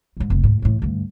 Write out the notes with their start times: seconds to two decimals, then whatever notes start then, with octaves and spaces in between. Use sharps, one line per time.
0.17 B1 G#2
0.30 F1 D#2
0.43 D2 G#2
0.62 A2 E3
0.82 D2 G2